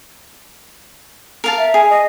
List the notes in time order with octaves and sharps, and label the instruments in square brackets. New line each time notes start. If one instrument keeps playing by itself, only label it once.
[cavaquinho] A#4 F5 A5
[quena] E5
[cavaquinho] G#4
[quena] D#5